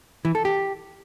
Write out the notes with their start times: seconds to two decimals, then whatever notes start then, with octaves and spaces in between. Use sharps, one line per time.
0.25 E3
0.35 A4
0.45 G4